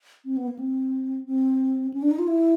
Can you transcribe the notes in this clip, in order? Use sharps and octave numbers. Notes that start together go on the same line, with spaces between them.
C4
B3
A#3
C4
C4
C#4
D4
D#4
F4
E4